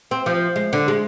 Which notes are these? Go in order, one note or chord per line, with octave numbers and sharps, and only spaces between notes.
C4
F3
G#3
D3
G#3